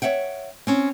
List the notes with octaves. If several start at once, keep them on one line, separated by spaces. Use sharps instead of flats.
C#5 D5 E5 F#5 G5
C4 C#4